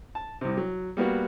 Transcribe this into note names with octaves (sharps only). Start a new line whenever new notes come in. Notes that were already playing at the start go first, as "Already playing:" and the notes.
A5
C2 C3
F#3
G3 A#3 B3 F#4